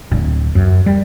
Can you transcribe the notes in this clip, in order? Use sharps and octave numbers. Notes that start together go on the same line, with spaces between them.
D1
F#2
G3